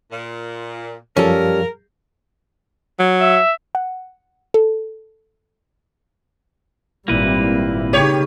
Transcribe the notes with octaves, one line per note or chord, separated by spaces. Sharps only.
A#2
F#2 F3 G3 C#4 G4 A4 A#4 F5
F#3
E5
F#5
A4
G#1 A#2 G3 A#3 C4 E4 B4
C#3 D#4 G4 C#5